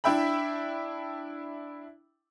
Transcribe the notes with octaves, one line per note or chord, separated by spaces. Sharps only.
D4 E4 E5 G5 B5